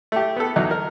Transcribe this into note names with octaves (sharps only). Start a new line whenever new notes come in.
A3 G4
B3 A4
E2 F#3 D#4
A#4